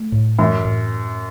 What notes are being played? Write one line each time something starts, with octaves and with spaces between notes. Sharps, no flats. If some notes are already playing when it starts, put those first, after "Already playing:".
Already playing: A3
A2
F#2 E3
A2